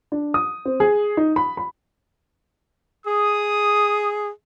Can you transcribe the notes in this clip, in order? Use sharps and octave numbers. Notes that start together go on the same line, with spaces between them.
D4
D#6
C4
G#4
D#4
B5
B5
G#4 D#6